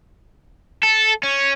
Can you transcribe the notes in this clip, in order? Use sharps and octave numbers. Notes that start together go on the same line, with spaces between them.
A4
C#4